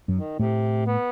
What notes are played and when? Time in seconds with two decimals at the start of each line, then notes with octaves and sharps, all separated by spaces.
0.08 F#2 F#3
0.16 D#3
0.39 A2 C3 A3
0.86 B3